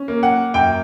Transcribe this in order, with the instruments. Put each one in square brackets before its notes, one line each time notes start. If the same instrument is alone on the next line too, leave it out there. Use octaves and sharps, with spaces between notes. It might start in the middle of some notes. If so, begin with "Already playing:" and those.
Already playing: [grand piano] C#4
A#3
[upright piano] F#5
[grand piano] F#2 [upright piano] G5